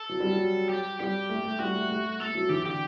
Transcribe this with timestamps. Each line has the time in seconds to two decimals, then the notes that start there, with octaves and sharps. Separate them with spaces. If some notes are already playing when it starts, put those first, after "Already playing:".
Already playing: A4
0.09 F#3
0.20 G3
0.30 F#3
0.69 G4
1.00 G3 G4
1.29 A3
1.45 A3
1.59 G3 F#4
1.75 A3
1.90 A3
2.20 A3 A4
2.35 F#3
2.49 E3 G4
2.66 D3 G4